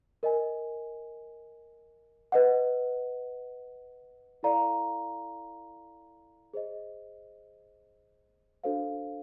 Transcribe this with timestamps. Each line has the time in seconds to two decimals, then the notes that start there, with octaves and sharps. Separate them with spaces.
0.23 A#4 D#5 G#5
2.32 B4 D#5 F#5
4.43 E4 A4 D5 F5 A#5
6.54 G#4 C5 D#5
8.64 D4 F#4 A4 C5 F5